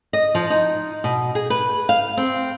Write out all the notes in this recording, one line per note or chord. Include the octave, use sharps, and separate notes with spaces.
D#5
F3
D#4
B2
G#4
B4
F5
C4